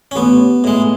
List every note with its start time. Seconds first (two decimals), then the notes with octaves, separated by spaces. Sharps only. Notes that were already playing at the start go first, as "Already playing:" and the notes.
0.11 C#4
0.16 A1 B3
0.64 A2 G#3